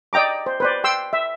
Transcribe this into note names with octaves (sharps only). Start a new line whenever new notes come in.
D5 D#5 G5 A#5 D6
C5
B4 C5 D5
G5 C6 E6
E5